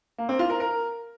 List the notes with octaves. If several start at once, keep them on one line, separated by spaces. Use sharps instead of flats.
A#3
C4
F4
A#4
A#4